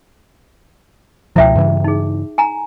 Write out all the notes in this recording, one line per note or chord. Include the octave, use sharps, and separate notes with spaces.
C#2 B2 F3 E4 E5 G5
G2 C#3 E3
D#4 G#4
G#5 A#5